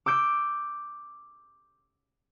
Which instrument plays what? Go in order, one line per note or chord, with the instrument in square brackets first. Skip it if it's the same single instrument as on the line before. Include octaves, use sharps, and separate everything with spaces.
[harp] D6 E6 G6 D7